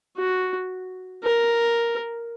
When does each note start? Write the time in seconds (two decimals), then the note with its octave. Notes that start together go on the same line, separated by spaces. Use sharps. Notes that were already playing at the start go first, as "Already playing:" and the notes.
0.18 F#4
1.23 A#4